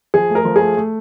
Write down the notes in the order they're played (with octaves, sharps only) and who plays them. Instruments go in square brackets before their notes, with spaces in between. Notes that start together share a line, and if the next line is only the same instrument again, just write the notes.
[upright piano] F3 G#4
A3
A#4
F3
G#4
A3
A3